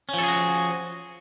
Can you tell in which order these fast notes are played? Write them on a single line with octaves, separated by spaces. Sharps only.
C#4 F3 A4 G#4 F#4